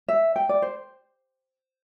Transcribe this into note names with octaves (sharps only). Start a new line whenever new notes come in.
E5
G5
D5
C5